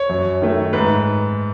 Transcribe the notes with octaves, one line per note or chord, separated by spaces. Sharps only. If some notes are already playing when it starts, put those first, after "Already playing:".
Already playing: C#5
F#2
D#3 A3
G#2 B4